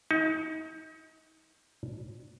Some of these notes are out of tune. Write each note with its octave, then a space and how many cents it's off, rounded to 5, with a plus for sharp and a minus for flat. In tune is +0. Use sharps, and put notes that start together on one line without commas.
D#4 +35